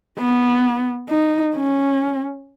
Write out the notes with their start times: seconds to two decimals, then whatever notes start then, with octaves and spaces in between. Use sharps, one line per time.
0.19 B3
1.10 D#4
1.55 C#4